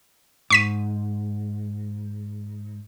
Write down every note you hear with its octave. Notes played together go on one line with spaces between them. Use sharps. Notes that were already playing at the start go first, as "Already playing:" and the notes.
G#2 C#6 B6 D#7